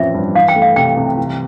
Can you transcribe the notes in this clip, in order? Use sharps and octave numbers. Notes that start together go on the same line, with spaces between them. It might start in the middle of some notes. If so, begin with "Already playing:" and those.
Already playing: A1 F3 C4 E5
G2
E3 F5
G5
A3
F5
C2 G5
C3
E3